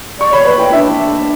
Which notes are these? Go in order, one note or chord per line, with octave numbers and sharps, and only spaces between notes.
D5 C#6
C#5 B5
B4 B5
E4 G5
D4 E5